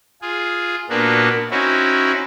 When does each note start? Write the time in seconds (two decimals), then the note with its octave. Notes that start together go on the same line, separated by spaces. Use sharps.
0.22 F4 G#4
0.90 A#2 A#3 B3 D4 F#4
1.51 C4 C#4 D#4 E4 F#4